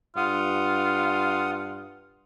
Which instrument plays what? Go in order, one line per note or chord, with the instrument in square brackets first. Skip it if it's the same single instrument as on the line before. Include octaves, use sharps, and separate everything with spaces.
[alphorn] G2 [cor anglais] F4 [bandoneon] F#5 D#6